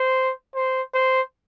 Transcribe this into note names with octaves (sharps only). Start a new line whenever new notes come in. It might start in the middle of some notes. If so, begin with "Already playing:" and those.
Already playing: C5
C5
C5